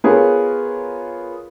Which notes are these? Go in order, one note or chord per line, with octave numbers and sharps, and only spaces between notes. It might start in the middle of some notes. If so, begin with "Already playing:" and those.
B3 F4 G#4 A#4 C#5